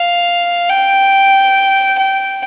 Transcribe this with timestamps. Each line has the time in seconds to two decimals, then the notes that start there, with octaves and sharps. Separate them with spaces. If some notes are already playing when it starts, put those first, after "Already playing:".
Already playing: F5
0.69 G5
1.99 G5